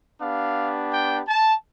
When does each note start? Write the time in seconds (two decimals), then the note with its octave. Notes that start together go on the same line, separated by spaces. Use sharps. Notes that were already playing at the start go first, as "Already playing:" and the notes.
0.20 B3 D4 G4 F5
0.92 G5
1.28 A5